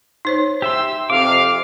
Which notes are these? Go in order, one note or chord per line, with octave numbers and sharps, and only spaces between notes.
D#4 C5 C#5
G4 E5 C6 E6
F2 C3 F5 D6